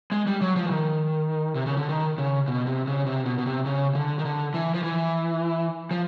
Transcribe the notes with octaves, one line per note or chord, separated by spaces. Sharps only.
G#3
G3
F#3
F3
E3
D#3
C3
C#3
D3
D#3
C#3
B2
C3
C#3
C3
B2
B2
C3
C#3
D3
D#3
D3
E3
F3
E3
F3